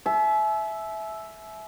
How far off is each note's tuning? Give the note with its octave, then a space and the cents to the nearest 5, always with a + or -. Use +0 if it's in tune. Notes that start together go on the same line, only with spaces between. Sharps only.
E5 +0 G#5 +45